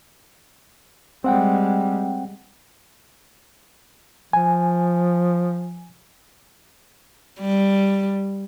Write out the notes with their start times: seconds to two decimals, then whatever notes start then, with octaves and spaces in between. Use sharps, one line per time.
1.24 G3 G#3 C4 F#5 G5
4.33 F3 G#5
7.40 G3